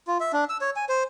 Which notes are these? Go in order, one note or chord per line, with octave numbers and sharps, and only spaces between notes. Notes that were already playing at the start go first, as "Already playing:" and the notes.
F4
E5
D4
E6
C#5
G#5
C5